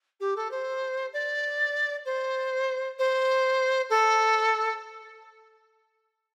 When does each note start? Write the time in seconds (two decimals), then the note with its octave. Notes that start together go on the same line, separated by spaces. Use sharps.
0.20 G4
0.36 A4
0.51 C5
1.13 D5
2.05 C5
2.98 C5
3.89 A4